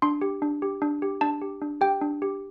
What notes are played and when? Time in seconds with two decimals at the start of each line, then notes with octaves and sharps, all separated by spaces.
0.02 D4 C6
0.21 G4
0.42 D4
0.62 G4
0.82 D4
1.02 G4
1.21 D4 A5
1.42 G4
1.62 D4
1.81 G4 G5
2.01 D4
2.22 G4